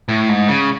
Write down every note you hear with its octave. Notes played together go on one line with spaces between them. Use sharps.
A2
G#2
C#3